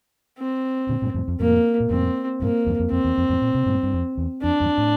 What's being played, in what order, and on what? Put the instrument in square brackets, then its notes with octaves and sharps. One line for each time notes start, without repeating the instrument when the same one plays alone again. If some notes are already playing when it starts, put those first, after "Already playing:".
[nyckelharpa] C4
[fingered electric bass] A#2 D3
G2 A#2
F2 A2
F2
[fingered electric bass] F2 A2 [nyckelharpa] A#3
[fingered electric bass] A#2
[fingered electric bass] F2 A2 [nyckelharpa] C4
[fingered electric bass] G2 A#2 [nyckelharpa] A#3
[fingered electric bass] E2 G2
F2
[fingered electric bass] F2 [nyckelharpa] C4
[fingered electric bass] E2
F2
F2 A2
A#2
C3
G2 A#2
G2
F2
E2
[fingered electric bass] F2 [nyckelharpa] D4
[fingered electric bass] E2 G2
A2